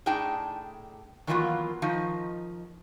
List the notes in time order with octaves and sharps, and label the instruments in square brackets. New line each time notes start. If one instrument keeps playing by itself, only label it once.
[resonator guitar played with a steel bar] A2 D4 D#4 G#4 G5 A5
D#3 E3 F#3 A#3 B3 F4
D#3 F3 D#4